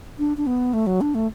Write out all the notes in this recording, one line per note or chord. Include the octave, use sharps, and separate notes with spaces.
D4
D4
B3
A3
F#3
D4
A3